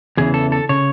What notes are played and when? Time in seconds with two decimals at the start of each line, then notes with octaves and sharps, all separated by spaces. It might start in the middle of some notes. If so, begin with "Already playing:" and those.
0.17 E2 C#3 E3 G#4
0.34 A4
0.52 A4
0.69 C#3 C#5